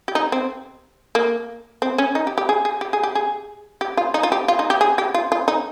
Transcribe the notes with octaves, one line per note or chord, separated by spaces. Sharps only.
G4
D#4
C4
A#3
C4
C#4
D#4
G4
G4
G#4
G#4
G4
G#4
G4
G#4
G4
F4
D#4
F4
G4
F4
D#4
G4
G#4
G4
F4
F4
D#4